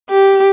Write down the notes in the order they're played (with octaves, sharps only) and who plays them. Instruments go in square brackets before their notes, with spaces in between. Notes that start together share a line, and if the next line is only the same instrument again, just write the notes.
[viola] G4